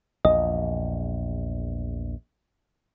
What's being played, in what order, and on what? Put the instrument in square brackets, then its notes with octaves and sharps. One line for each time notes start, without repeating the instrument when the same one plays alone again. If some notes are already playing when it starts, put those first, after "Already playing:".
[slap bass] A#1 E2 [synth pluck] D#5